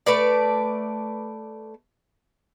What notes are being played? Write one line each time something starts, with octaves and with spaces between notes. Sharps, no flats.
A3 B4 D5